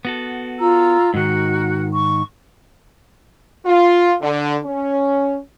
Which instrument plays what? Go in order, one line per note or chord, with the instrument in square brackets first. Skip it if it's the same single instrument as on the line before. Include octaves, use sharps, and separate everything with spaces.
[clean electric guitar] B3 F#4 A4
[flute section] F4 A#5 E6
[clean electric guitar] G#2 D#3 [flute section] F#4 A#4
[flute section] C#6
[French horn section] F4
D3
C#4